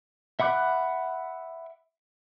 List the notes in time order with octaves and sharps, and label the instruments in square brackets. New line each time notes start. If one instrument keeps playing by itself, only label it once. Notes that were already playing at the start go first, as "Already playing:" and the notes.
[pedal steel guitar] E5 F#5 B5 D6 F#6